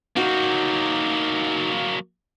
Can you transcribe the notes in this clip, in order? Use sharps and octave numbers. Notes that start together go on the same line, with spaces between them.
F#3 A#3 D#4 F#4